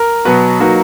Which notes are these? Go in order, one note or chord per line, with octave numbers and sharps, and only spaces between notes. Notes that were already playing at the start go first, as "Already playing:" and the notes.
Already playing: A#4
B2 F#3 B3 F#4 B4
F#3 A#3 D#4 F#4 B4